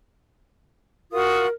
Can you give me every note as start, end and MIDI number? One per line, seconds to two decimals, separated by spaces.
1.12 1.46 65
1.12 1.46 66
1.12 1.49 70
1.12 1.46 87